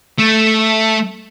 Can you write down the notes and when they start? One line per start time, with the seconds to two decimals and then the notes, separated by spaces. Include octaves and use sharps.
0.18 A3